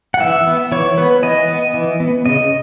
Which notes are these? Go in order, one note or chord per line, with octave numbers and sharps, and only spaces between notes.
F#5
E3 E5
B3
E3 C#5
B3 B4
E3 D#5
B3
E3
B3
C#3 D#5